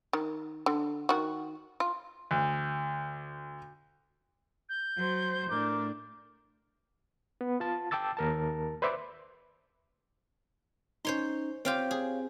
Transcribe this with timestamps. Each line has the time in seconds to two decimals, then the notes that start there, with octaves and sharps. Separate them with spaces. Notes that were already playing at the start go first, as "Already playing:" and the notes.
0.13 D#3
0.66 D3
1.09 D#3 F#4
1.80 F4
2.31 D2
4.69 G6
4.97 F#3 C5
5.51 A2 D4 A#4 D6
7.41 B3
7.60 F4 A5
7.91 G5 A5 D6 E6 A6
8.17 D#2 A#4 A5
8.82 B4 C5 D5 E5 C6 D6
11.05 C#4 D#4 C5 C#5 C6
11.65 C4 F4 G4 C#5 F5
11.91 G#4